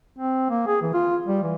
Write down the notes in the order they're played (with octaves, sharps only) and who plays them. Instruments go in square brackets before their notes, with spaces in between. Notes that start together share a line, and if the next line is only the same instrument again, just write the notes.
[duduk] C4
A#3
G#4
E3
F4
G3
E3